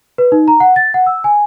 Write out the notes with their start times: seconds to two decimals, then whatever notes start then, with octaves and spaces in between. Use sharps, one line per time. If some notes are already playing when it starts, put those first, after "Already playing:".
0.18 B4
0.32 D#4
0.48 A#5
0.60 F#5
0.76 A6
0.94 F#5
1.06 E6
1.24 G#5